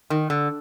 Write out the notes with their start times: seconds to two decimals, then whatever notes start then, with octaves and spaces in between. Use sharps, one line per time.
0.10 D#3
0.30 D3